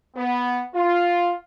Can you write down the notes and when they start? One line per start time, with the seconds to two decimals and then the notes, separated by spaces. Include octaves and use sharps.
0.16 B3
0.74 F4